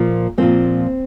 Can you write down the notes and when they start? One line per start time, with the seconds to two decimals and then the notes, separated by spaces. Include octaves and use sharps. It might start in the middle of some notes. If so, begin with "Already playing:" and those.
Already playing: A#2 F3 A#3
0.38 A#2 F3 A#3 C4